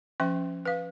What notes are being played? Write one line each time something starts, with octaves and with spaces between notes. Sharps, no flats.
F3 C#4 E5 C6
B4 F5